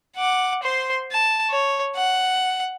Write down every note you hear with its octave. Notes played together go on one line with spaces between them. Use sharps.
F#5 D6
C5 C6
A5
C#5
F#5